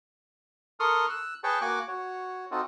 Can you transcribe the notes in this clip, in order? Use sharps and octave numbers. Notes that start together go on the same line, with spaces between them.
A4 A#4 C6 C#6 D#6 F6
E6 F#6
G#4 B4 C#5 G5 A5 C#6
A#3 F#4 G#5 C#6 D6 F#6
F#4 C#5
C4 D#4 F4 F#4 A4